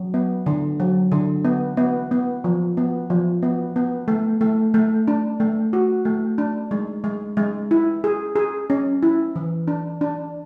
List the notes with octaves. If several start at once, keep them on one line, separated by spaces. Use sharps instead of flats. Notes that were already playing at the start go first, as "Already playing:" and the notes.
Already playing: F#3
B3
D3
F#3
D3
B3
B3
B3
F3
B3
F3
B3
B3
A3
A3
A3
D4
A3
F#4
A3
D4
G#3
G#3
G#3
E4
G#4
G#4
C#4
E4
E3
D4
D4